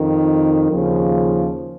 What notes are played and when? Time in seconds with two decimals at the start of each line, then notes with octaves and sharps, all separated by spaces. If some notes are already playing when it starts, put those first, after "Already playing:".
Already playing: F2 D#3
0.69 D#2 C#3 F3